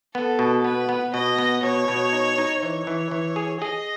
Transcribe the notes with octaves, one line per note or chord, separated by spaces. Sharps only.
B3 A4
B2
B3 B4
B3
B2 D#5
B3
B2 C#5
B2
D#4
D#4
E3 C#5
E3
E3
G#4
G#4 D#5